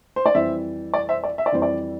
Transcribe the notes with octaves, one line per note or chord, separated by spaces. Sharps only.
C5
D5
F2 E3 G3 C5 E5
D5
C5 E5
D5
E5
D5
F2 E3 G3 C5
D5